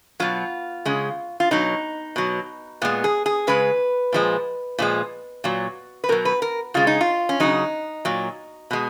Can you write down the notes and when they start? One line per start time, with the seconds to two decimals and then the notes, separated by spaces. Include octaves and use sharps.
0.20 B2 F#3 F4
0.85 C#3 G#3
1.40 F4
1.51 B2 F#3 D#4
2.16 B2 F#3
2.82 A#2 G#3 B3
3.04 G#4
3.26 G#4
3.47 C#3 G#3 B4
4.13 A#2 F3 G#3
4.79 A#2 F3 G#3
5.44 A#2 F#3
6.04 B4
6.09 B2 F#3 A#4
6.25 B4
6.42 A#4
6.74 C#3 G#3 F4
6.87 D#4
7.01 F4
7.29 C#4
7.40 C#3 F#3 D#4
8.05 A#2 F#3
8.71 B2 G#3